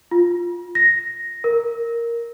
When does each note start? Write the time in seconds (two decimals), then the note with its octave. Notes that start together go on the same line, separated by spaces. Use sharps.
0.11 F4
0.75 A#6
1.44 A#4